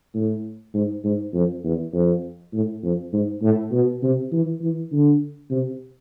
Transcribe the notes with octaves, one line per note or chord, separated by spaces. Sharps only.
A2
G#2
G#2
F2
E2
F2
A2
F2
G#2
A2
B2
C3
E3
E3
D3
C3